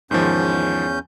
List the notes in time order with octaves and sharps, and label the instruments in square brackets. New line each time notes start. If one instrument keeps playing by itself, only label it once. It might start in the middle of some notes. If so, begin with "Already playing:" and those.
[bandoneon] E2 C#4 G6 [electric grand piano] G#2 D#3 F3